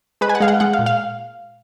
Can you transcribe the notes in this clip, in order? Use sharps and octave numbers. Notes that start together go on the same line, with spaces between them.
G#3 B4
G#5
F#5
G#3 F5
F#5
G#3 F#5
F5
A#2
F5